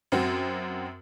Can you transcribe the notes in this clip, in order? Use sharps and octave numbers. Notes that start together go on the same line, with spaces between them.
F#2 C4 F#4